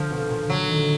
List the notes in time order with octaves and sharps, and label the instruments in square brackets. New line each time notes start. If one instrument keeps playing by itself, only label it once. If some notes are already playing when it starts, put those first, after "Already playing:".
Already playing: [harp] D3 [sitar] F3
[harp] B2
A#2
[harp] D3 [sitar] F#3
[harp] D#3